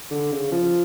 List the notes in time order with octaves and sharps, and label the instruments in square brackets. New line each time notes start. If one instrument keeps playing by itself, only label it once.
[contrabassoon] D3
C#3
F3